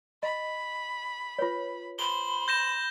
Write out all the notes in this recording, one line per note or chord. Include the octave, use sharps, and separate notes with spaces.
D#5 B5
F4 B4 C#5
C5 B5 G7
G6 A#6 E7